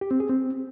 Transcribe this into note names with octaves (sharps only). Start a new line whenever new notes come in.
G4
C4
G#4
C4